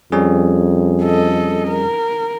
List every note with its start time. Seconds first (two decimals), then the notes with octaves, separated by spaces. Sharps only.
0.12 F2 G3 C#4 G#4
1.03 A4 D#5
1.68 A#4